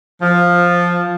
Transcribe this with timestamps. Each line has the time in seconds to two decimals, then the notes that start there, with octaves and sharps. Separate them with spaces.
0.22 F3